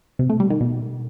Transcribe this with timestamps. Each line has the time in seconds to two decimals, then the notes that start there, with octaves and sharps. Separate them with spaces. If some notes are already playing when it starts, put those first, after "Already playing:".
0.19 C3
0.30 A3
0.40 G3
0.50 D#3
0.61 B2